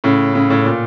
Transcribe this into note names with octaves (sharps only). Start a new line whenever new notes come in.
A2 C#3
A2 C#3
A2 C#3
A#2